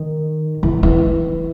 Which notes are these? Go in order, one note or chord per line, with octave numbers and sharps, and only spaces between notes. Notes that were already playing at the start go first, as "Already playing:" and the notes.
Already playing: D#3
E3
E3